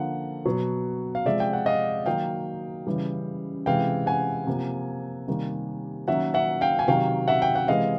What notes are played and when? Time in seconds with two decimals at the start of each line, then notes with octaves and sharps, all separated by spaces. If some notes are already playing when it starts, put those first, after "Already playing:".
Already playing: D3 F3 A#3 F#5
0.45 B2 F#3 B3
1.15 F5
1.25 C3 F3 G#3 D5 E5
1.40 G5
1.53 F#5
1.66 D#5 F5
2.06 D#3 F#3 A#3 F5 G5
2.87 C#3 E3 G3
3.66 C3 E3 G#3 F5 G5
4.06 F#5 G#5
4.47 C3 F3 A#3
5.28 C3 D#3 G3 A#3
6.08 D#3 F#3 A#3 C#4 E5 F#5
6.34 E5 F#5
6.61 F5 G5
6.79 G#5
6.88 C3 D#3 F#3 F5 G5
7.28 E5 F#5
7.42 G5
7.55 F#5
7.68 C3 E3 G#3 D#5 F5